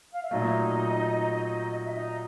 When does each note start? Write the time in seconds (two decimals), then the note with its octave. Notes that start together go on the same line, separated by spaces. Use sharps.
0.12 F5
0.22 E5
0.31 A#2 F#3 A3 D#4 D#5
1.85 E5
1.92 D#4 D#5